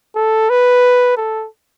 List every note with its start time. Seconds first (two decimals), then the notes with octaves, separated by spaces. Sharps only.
0.16 A4
0.50 B4
1.17 A4